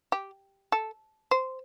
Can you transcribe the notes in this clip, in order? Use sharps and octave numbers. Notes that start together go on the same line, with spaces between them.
G4
A4
C5